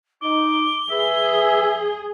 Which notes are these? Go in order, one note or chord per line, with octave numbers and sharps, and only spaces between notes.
D#4 D6 G7
G#4 B4 E5